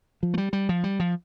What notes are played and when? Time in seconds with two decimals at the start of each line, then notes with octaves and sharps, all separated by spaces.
0.23 F3
0.34 A3
0.38 G3
0.53 G3
0.69 F3
0.84 G3
1.00 F3